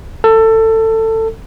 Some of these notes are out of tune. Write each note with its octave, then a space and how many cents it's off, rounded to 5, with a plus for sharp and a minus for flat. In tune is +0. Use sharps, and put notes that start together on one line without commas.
A4 +20